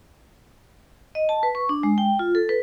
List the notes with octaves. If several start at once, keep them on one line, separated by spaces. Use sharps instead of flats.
D#5
A5
B4
C#6
D4
G#3
G5
F4
A4
B4